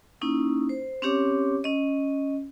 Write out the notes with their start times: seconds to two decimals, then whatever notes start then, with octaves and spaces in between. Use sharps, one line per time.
0.21 A#3 C#4 D#4 E4
0.69 C5
1.02 C4 C#4 G4 C#5 D6
1.64 C#4 D#5